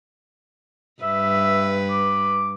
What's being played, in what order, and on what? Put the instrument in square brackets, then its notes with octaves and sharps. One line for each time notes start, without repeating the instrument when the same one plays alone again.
[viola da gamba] G2 B4 [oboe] E5
[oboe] D6